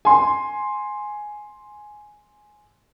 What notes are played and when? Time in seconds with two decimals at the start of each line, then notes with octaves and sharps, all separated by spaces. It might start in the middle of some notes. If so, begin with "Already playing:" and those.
0.05 G#5 C6